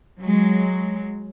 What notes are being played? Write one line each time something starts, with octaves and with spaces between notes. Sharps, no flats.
F#3 G#3